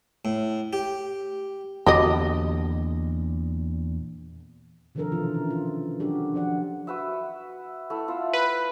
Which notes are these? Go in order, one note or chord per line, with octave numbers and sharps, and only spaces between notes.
A2
G4
E2 A#2 D3 F#4 G4 D#5
C3 D#3 F3 D4 A4 A#4
B2 D#3 E3 F4
C#4
F4
F#3 D4 F#4 G4 A4
F3 D5 F#5
F#4 B4 E5
A3 E4
F4 E5 F#5
B4